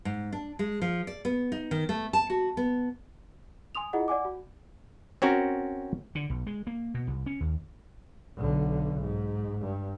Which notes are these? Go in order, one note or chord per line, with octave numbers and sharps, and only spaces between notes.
G#2
D4
G#3
F3
D5
B3
D#4
D#3
A3
A5
F#4
B3
G#5 C6 D#6 F7
E4 F4 G#4 D#5 F#5
D5 F#5 G#5 D6
F#4
C4 C#4 F#4 A#4
D3
B1
G#3
A#3
B2
C2
C#4
D#2
B1 D3
G#2
G2